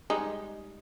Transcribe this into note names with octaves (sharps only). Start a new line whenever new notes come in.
G3 G#3 D#4